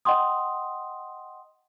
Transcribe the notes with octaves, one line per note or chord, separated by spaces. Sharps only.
D#5 F#5 G5 C6 D#6